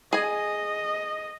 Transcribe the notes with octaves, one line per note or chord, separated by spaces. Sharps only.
G#4 D#5 G#5